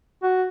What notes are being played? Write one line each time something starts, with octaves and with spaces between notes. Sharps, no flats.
F#4